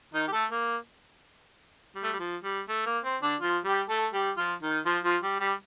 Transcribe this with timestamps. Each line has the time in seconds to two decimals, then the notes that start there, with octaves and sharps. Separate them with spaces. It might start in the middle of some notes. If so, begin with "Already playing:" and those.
0.14 D#3 D#4
0.28 G4
0.32 A3 A4
0.51 A#3
1.95 G3
2.04 A3
2.13 G3
2.19 F3
2.44 G3
2.69 A3
2.86 A#3
3.04 C4
3.22 D3 D4
3.41 F3 F4
3.65 G3 G4
3.89 A3 A4
4.13 G3 G4
4.37 F3 F4
4.62 D#3 D#4
4.86 F3 F4
5.04 F3 F4
5.23 G3 G4
5.40 G3 G4